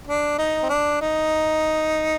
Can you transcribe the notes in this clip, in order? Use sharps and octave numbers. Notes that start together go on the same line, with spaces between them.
D4
D#4
C4
D4
D#4